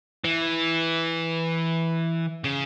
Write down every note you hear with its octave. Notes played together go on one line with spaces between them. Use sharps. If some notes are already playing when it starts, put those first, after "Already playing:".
E3
C#3